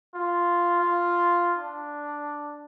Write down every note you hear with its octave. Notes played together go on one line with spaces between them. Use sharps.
F4
F4
D4